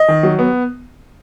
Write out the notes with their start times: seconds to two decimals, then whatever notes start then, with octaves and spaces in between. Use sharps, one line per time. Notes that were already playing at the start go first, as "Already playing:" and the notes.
Already playing: D#5
0.08 D#3
0.23 F#3
0.39 B3